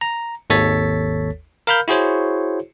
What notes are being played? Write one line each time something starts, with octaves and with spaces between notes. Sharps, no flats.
A#5
G#1 D#2 A4 C#5 A6 B6
A#4 F5 B5 F6 G6
E4 F#4 G#4 C5 C#5